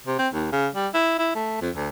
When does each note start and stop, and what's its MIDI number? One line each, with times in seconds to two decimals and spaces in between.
0.07 0.17 48
0.19 0.28 60
0.33 0.49 39
0.52 0.68 49
0.75 0.88 55
0.94 1.18 64
1.18 1.30 64
1.35 1.61 57
1.61 1.70 41
1.75 1.89 38